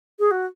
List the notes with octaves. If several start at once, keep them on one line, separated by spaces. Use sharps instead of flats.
G#4
F#4